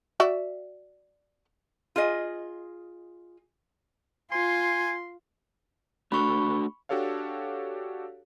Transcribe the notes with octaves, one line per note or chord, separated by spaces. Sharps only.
F#4 D5 E5
F4 G#4 D#5
F4 G#5 C6
A3 D4 F#4 B5 C#6
D4 F#4 G4 A4 C#5 F5